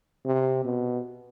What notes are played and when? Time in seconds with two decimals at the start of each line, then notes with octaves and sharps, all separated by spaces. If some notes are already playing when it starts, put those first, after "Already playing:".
0.25 C3
0.65 B2